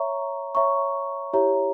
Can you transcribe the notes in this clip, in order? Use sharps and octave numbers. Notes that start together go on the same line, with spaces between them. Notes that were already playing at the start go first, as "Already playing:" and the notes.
Already playing: C#5 E5 A#5 C#6
C#5 E5 A#5 C#6
E4 G4 C#5 E5 A#5